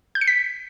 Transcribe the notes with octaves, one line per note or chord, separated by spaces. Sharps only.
G6
C#7
B6